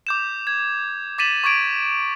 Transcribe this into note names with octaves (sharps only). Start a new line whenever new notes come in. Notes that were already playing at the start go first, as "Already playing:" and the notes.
D6 G6 E7
G#6
D6 A6 B6 D#7 E7 F#7
C#6 D6 G#6 D7 D#7